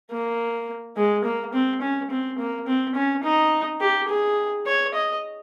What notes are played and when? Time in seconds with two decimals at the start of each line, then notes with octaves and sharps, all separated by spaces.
0.11 A#3
0.97 G#3
1.24 A#3
1.53 C4
1.82 C#4
2.11 C4
2.39 A#3
2.67 C4
2.95 C#4
3.24 D#4
3.81 G4
4.09 G#4
4.66 C#5
4.94 D#5